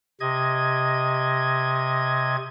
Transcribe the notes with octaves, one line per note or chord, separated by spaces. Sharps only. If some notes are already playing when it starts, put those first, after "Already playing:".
C3 D#5 G#6